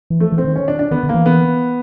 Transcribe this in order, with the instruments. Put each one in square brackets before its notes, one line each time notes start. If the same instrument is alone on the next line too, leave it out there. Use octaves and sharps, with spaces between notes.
[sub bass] E3
[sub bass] F3 [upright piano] A3
[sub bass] E3
[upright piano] C4
[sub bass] D#3
[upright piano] C#4
D4
D4
[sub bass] D#3 [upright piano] B3
[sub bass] D3
[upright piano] A#3
[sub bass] E3
[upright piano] B3